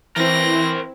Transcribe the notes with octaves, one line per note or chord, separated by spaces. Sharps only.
E3 C4 E4 A#4 C5 A#6